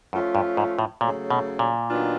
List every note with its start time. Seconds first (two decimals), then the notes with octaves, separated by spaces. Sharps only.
0.12 F#2 F3 A3 C#4 F4
0.35 G2
0.57 G#2
0.79 A2
1.01 A#2 C#3 F#3 A3
1.30 B2
1.59 A#2
1.89 D#3 F#3 B3 D4 F4